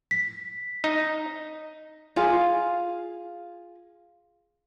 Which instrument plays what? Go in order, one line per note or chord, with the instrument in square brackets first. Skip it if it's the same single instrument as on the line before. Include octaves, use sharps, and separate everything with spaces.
[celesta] B6
[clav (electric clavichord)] D#4
[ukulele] F4 G#4 F5